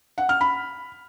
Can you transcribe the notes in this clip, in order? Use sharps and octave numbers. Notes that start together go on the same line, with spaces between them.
F#5
F6
B5